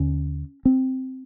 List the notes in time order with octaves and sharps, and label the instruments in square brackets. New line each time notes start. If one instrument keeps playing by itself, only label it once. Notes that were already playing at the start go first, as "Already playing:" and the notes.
Already playing: [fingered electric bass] D#2 D3 C#4
C4